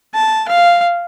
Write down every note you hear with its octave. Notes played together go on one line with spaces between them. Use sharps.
A5
F5